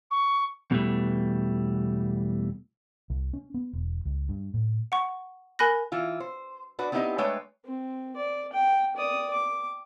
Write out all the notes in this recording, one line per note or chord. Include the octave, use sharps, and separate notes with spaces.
C#6
E2 B2 E3 F3 G3 A3
C2
C#4
B3
E1
C#2
G2
A2
F#5 C#6
A#4 G#5 B5 F#6 A#6
E3 E4 F4
C5
D4 F#4 B4
B3 C4 D#4 E4 G4 D#5
G#3 A3 D4 B4 C#5 G5
C4
D5
G5
D5 D#6
D6